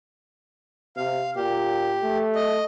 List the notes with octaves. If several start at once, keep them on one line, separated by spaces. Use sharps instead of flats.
C3 F5
A#2 G4
A3
D#5